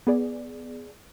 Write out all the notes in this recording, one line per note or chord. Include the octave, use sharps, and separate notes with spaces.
B3 G#4 D5